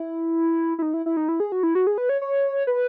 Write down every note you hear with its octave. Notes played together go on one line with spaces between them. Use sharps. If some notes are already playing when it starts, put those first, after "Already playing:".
Already playing: E4
E4
D#4
E4
E4
D#4
E4
G#4
F#4
E4
F#4
G#4
B4
C#5
C#5
B4